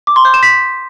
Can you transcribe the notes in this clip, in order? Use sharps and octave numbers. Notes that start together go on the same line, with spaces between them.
D6
C6
G6
E7
B6